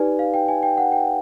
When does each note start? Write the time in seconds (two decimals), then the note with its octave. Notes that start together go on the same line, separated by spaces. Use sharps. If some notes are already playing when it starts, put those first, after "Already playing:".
Already playing: D#4 G4 B4 D5 G#5
0.19 F5
0.34 G5
0.48 G#5
0.63 G5
0.78 F#5
0.92 G5